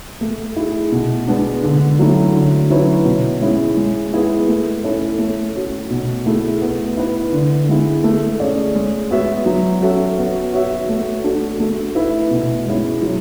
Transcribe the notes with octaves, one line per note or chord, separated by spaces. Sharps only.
A3
E4 G#4
B2
G#3 B3 D4
D3
F#3 A3 C#4 E4
D3
F#3 C#4 E4 B4
B2
G#3 C#4 E4
G#3
B3 E4 G#4 B4
A3
C#4 E4 A4
A3
C#4 F#4
B2
A3 E4 G#4
B3
E4 B4
D3
G#3 B3 E4
A3
C#4 G#4 D5
G#3
B3 F#4 C#5 E5
F#3
C#4 F#4 A4 E5
B3
F#4 C#5 E5
A3
D4 F#4 A4
A3
E4 B4 E5
B2
G#3 C#4 E4
F#3